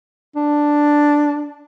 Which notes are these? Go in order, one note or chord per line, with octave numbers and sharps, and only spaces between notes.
D4